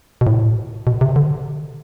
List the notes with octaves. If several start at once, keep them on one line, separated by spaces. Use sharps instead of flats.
B2
A2
B2
C3
D3